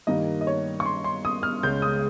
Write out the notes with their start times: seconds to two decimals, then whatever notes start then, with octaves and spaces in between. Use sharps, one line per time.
0.07 G2 D#3 G3 A#3 D#5
0.41 D#5
0.47 C#5
0.80 C#6
0.86 C6
1.04 C6
1.25 D#6
1.43 F6
1.63 C#2 C#3 G#3 G6
1.82 D#6